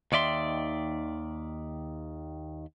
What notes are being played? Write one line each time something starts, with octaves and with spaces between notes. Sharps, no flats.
D#2 D#3 D5 E5 C6